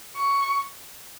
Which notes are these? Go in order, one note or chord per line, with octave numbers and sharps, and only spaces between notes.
C#6